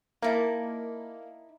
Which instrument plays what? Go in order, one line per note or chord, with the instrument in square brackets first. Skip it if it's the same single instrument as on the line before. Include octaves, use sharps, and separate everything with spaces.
[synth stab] A#3 [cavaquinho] D#4 E4 A5